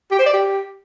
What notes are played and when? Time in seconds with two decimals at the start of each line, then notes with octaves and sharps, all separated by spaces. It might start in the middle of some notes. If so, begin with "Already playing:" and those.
0.11 G4
0.19 C5
0.26 D5
0.33 G4